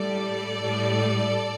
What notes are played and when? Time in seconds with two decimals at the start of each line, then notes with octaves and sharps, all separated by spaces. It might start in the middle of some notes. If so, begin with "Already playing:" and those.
Already playing: A2 G3 A4 D5
0.61 A2 G3